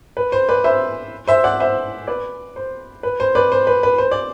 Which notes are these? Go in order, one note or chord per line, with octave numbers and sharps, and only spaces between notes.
B4
C5
B4 D5
C5 E5
C5 E5
D5 F#5
C5 E5
B4 D5
C5
B4
C5
B4 D5
C5
B4
B4
C5
D5